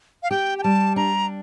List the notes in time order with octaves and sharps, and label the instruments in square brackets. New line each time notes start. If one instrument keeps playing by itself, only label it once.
[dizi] F5
[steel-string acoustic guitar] G4 [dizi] G5
[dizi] G5
[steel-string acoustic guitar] G3 [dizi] A5
[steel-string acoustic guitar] D4 [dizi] A#5